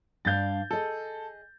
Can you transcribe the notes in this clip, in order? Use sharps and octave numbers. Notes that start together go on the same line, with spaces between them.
G2 D4 F5 G6 A6
G#4 A4 D#5